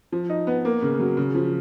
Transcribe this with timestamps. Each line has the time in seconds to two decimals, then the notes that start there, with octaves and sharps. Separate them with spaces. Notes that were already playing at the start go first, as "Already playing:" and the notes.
0.12 F3
0.29 D#4
0.47 B3
0.65 A#3
0.82 C#3
1.00 F#3
1.17 C#3
1.35 F3